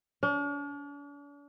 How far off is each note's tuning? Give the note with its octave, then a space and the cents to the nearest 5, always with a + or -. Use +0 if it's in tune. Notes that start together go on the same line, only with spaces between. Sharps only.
D4 -45